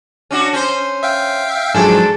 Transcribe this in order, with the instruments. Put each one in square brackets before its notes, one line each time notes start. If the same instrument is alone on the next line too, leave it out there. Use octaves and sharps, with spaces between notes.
[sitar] C#4 D4 F#4
C#4 C5
[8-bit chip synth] E5 F5 G5
[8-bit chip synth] G#2 F3 F#3 [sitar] D4 A4 [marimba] G#4 G#5